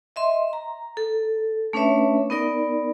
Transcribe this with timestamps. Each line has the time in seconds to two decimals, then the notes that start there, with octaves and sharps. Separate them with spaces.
0.16 D#5 E5 C6
0.53 A#5
0.97 A4
1.73 A3 C#4 D4 B4 C#5 E5
2.30 B3 D#4 A#4 D5